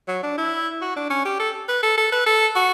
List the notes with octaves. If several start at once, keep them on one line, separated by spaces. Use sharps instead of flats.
F#3
D4
E4
F#4
D4
C#4
G4
A4
B4
A4
A4
B4
A4
F#4